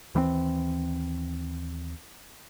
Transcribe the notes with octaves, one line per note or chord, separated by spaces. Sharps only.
D#2 E3 G3 C4